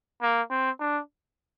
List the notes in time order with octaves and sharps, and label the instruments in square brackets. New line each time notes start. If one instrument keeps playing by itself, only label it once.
[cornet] A#3
C4
D4